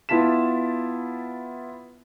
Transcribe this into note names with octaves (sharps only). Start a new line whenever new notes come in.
B3 E4 F4 A5 B6 E7